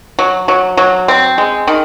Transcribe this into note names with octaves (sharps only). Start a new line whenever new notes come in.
F#3
F#3
F#3
C4
G#3
D#3